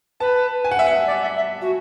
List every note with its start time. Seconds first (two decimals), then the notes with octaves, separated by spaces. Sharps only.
0.20 B4 A5
0.64 G#5
0.71 F#5
0.79 E5
0.87 F#5
1.07 D5
1.21 E5
1.36 E5
1.62 F#4